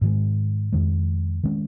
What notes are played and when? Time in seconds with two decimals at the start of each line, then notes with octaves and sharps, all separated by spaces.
0.01 G#2 D#3 G#3
0.72 F2 D#3 G#3
1.43 D#3 G#3 C#4